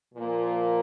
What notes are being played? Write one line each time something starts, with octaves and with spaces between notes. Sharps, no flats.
A#2 F3 A#3